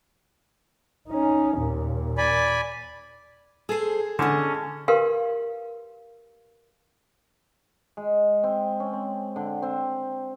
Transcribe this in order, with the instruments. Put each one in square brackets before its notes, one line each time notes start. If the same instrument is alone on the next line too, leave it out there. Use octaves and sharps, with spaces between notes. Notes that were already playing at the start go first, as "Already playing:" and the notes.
[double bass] C#4 D#4
D#2 A#2
[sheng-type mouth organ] D5 G#5 B5
[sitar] G#4 [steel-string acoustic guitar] A4 C5
[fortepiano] D3 [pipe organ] C#4 [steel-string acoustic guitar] D#5 A5
[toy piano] G4 A#4 B4 F5 C6
[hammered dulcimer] G#3
C4
C#4
C4
D3
C4